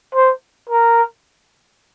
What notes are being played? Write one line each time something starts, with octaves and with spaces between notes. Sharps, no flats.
C5
A#4